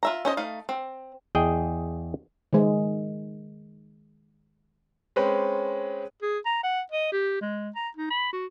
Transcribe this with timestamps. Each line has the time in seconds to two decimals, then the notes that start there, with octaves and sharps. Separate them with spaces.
0.03 F4 E5 A#5
0.25 C#4 C5 D#5
0.37 A3 D#4 F5
0.69 C4
1.35 E2 G#4 D#5 G5
2.53 D#3 G#3
5.16 G#3 C4 C#4 B4 G5
6.22 G#4
6.46 A#5
6.64 F#5
6.92 D#5
7.12 G4
7.41 G#3
7.76 A#5
7.97 D#4
8.11 B5
8.33 F#4